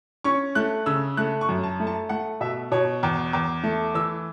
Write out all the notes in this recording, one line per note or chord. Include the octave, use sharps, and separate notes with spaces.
C#4 C#6
A3 F#6
C#3 E6
A3 F#6
C#6
F#2
A5
A3
A5
A3 F#5
B2 E5
B2 C#5
E2
E2
A3
E3 E6